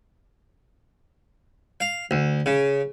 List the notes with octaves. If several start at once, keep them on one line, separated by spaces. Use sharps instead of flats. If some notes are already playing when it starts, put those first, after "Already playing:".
F5
D2
C#3